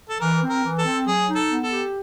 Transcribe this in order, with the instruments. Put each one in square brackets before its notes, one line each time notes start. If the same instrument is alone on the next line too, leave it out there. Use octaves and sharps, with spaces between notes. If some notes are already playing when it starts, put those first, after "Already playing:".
[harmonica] A4
[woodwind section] E3 [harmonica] A#4
[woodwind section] C4
[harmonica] A#4
[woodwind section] E3
[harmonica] A4
[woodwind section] C4
[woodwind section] F#3 [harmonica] G#4
[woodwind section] D#4
[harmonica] A4
[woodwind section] B3
[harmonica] A4
[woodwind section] G4